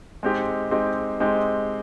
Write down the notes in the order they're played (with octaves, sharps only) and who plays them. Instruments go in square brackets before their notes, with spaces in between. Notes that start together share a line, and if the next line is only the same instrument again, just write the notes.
[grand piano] G#3 C4 D#4 G4
G#3 C4 D#4 G4
G#3 C4 D#4 G4